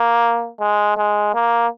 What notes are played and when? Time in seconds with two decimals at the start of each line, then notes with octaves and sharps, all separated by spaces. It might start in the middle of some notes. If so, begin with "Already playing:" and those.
Already playing: A#3
0.60 G#3
0.97 G#3
1.34 A#3